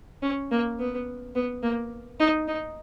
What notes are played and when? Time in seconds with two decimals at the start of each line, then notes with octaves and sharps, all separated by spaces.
0.22 C#4
0.51 A#3
0.79 B3
1.35 B3
1.63 A#3
2.20 D#4
2.48 D#4